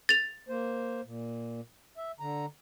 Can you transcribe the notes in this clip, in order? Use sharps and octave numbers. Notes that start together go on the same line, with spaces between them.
A6 F7
A#3 C5
A#2
E5
D3 A#5